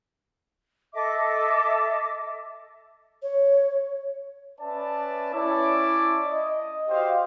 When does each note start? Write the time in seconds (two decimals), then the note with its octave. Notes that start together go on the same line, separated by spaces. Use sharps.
0.93 A4 D#5 E5 D6
3.23 C#5
4.59 C#4 B4 D5 E5 A5
5.34 C#4 E4 C#5 D5 E5 A5
6.27 D#5
6.89 F#4 G4 C5 D#5 F5